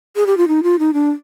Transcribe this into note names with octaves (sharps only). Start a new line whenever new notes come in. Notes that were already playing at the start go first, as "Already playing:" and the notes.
G#4
G4
F4
D#4
F4
D#4
D4